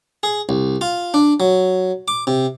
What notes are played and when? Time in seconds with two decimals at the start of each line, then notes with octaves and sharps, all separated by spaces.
0.23 G#4
0.49 C2
0.81 F4
1.14 D4
1.40 F#3
2.08 D6
2.27 C3